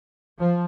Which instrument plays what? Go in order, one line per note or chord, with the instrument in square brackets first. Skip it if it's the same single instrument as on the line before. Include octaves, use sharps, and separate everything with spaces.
[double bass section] F3